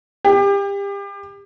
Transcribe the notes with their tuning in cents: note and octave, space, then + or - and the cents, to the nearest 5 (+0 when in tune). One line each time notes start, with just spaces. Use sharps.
G4 +30